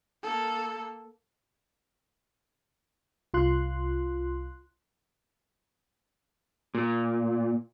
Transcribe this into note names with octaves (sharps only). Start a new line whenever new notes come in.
A#3 A4
C2 F4 C6 F#6
A#2